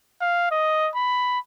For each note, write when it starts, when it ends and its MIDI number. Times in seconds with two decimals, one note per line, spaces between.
0.21 0.51 77
0.51 0.90 75
0.95 1.39 83